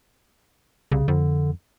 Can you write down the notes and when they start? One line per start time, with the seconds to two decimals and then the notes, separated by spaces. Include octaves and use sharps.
0.92 C2 C#3
1.08 F2 D3